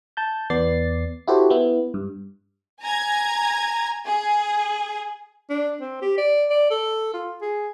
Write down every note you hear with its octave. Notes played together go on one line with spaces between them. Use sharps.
A5 G6
E2 B3 D5 A6 C7
E4 F#4 G4 A4 C5
B3 E4
G2
G#5 A#5 G#6
G#4
D4
C4
G4
D5
D5
A4
F4
G#4